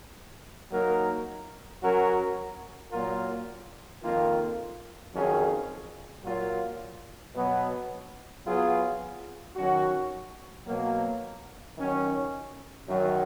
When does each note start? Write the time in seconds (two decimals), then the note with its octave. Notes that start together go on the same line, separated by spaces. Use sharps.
0.71 F#3 A#3 D#4 A#4
1.81 F#3 C#4 F#4 A#4
2.92 A#2 F#3 A#3 F4 A#4
4.02 F2 D#3 A#3 F4
5.13 F2 D#3 F#3 C#4 G#4
6.24 A#2 F#3 A#3 F4
7.34 B2 F#3 B3
8.45 F#3 B3 F4 G#4
9.56 D#3 F#3 C#4 F#4
10.67 B2 F#3 A#3
11.77 D#3 F#3 C#4
12.87 F#2 D#3 F#3